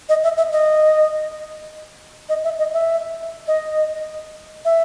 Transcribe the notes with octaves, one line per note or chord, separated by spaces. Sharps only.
D#5
E5
E5
D#5
D#5
E5
D#5
E5
D#5
E5